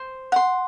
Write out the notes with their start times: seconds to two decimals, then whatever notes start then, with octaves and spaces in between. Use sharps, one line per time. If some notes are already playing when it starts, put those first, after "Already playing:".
Already playing: C5
0.32 F#5 C6